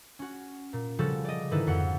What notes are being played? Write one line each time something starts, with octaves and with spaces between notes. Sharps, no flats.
C#4 F#4
A#2
C#3 F3 G3 F#4 A4
D5 D#5
G#2 D3 D#3 E4 A4 B4
F2 F#4 F#5